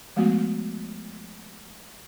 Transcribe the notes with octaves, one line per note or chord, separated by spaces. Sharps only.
F3 G#3 A3 B3 F#4